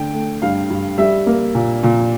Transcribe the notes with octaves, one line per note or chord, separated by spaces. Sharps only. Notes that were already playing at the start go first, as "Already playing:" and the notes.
Already playing: D3 A3 G5
A3
G2 F5
G2
G3 E5
A#3
A#2
A#2